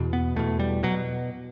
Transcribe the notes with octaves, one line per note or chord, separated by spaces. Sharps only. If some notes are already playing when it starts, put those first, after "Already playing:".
Already playing: E2 B2
B3
E2 B2 A3
G3
B2 F#3